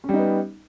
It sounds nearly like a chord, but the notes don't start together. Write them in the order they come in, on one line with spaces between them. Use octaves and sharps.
C#4 G3 D#4 B3